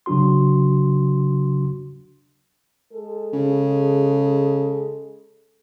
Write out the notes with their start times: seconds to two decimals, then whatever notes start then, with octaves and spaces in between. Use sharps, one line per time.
0.06 C#3 F#3 D4 F#4 C6
2.92 G#3 G#4 A4
3.34 C#3